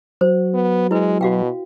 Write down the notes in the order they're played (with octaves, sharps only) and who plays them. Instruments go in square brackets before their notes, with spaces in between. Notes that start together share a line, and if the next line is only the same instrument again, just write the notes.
[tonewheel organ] F#3 [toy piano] C5
[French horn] B3
[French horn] G#3 [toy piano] E4 B4
[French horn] B2 [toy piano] F#4 F5 G5